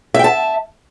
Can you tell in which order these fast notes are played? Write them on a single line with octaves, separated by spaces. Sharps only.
E5 G5 A5